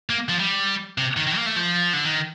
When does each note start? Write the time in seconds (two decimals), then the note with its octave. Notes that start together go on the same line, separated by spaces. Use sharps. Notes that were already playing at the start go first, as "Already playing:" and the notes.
0.10 A#3
0.29 F3
0.40 G3
0.98 C3
1.17 D#3
1.27 D#3
1.37 A#3
1.46 A3
1.56 F3
1.93 D3
2.05 D#3